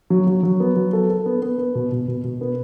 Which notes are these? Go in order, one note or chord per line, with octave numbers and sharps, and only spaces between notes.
F#3
F#3
F#3
B3
F#3
A4
A4
B3
B3
B3
B2
B2
B2
B2
B3